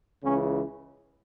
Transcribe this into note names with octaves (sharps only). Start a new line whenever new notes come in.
C#2 C#3 E3 C#4